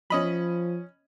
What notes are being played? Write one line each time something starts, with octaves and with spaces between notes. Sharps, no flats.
F3 C#4 D#5 B5